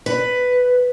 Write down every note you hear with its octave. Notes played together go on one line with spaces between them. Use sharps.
B4